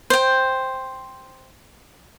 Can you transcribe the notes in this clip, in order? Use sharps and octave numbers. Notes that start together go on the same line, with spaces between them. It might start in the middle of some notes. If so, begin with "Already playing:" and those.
C5 G5